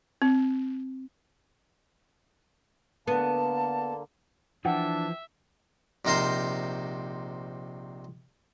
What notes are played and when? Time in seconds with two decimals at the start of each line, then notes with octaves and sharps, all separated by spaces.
0.22 C4
3.07 D3 A#3 B3 A5
4.65 E3 F3 D4 E5 F#5 G5
6.05 A#1 C3 D#4 A#4 C5 C6